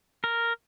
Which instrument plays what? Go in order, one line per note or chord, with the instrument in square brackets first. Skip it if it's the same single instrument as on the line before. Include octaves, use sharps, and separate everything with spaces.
[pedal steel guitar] A#4